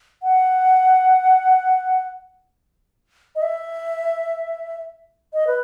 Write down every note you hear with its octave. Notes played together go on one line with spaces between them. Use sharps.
F#5
D#5
E5
D#5
B4